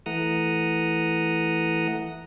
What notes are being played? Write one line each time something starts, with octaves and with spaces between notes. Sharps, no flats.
E3 A3 F#5 A#5 D#6